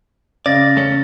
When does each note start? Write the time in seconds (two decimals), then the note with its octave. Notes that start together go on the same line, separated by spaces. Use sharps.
0.46 C#3 D5 A6 A#6
0.76 E2 A3 C#4